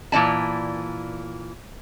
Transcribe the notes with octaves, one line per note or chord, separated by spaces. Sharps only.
A#2 E3 D5 A5